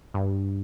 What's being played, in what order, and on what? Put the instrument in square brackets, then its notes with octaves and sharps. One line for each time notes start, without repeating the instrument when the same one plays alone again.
[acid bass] G2